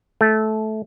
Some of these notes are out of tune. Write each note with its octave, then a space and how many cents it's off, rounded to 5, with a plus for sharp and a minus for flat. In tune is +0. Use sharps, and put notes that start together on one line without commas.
A3 -15